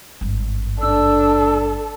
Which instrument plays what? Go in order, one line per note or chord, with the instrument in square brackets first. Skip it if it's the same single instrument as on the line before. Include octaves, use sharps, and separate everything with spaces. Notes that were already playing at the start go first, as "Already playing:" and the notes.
[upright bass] G#1 G2
[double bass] D4 [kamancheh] A4 [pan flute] E6